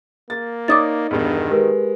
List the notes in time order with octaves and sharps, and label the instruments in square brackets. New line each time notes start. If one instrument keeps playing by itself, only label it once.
[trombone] A#3 [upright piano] A6
[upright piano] D#4 C#5 D5 [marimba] D6 D#6 A6
[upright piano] E1 G2 B2 [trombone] D#3
[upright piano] G#3 [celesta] G4 A#4 B4